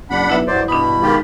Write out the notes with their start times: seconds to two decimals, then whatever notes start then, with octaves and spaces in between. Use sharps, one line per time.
0.10 F#1 D4 F#5 B5
0.30 B1 E4 B4 E5
0.47 G2 E3 F#3 C5 D5
0.68 G2 B2 D4 B5 D#6
1.02 G#2 D#3 F4 G4